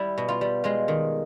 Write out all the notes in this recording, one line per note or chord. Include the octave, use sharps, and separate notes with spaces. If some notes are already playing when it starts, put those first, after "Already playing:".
Already playing: G3 E4
B2
F4
G3
G#3 F4
D#3